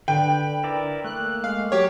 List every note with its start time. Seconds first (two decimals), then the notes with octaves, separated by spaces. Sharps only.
0.08 D3 B4 G5
0.64 E4 A#4 D5
1.04 A3 A#3 F#6
1.44 G#3 F5
1.72 F#3 G4 C#5